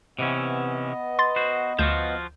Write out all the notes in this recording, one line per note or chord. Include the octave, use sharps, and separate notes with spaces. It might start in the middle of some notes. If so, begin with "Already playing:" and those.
C3 E3 B3 C#4 D#5
C6 A6
F#4 C5
D2 F3 F4 F#4 G6 E7